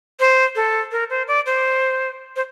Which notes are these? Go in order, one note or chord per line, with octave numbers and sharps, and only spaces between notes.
C5
A4
A#4
C5
D5
C5
C5